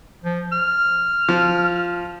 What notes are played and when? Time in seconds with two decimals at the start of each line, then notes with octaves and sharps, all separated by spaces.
0.24 F3
0.52 F6
1.29 F3